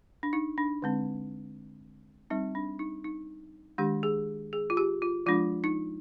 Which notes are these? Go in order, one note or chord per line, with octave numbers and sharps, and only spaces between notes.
D4
D#4
D4
D3 G#3 C4
G3 C4 D#4
D4
D#4
D#4
D#3 G#3 D4 G4
G#4
G#4
F4
G4
F4
F3 G#3 D4 F4
D#4